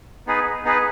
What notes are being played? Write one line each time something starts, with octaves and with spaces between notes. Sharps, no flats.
B3 D#4 G#4 B4
B3 D#4 G#4 B4